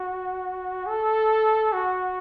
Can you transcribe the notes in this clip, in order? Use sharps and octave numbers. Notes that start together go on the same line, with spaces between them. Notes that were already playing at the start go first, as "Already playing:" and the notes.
Already playing: F#4
A4
F#4